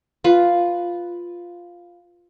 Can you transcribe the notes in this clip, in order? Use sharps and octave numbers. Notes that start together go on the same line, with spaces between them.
F4 B4